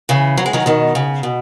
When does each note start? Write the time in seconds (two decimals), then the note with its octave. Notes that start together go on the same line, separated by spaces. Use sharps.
0.09 C#3 E3
0.37 F#3
0.46 G#3
0.53 D#3 F#3
0.66 B2 D#3
0.95 C#3
1.23 B2